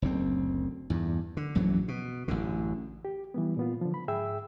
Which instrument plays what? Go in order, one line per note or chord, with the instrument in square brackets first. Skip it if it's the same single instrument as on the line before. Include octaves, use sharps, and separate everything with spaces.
[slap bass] F#1 D2 C4
E2 G2
D3
A#1 F#2 E3 F#3
B2
A1 F#2 D3
[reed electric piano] G4
E3 G3 B3
A#2 B3 F4
D3 F3
B5
G#2 G#4 E5 G5 E6